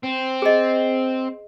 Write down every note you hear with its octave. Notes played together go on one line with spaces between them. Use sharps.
C4
G#4 D#5